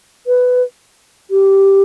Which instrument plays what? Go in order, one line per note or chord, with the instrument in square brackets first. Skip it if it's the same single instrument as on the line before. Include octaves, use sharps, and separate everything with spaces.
[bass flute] B4
G4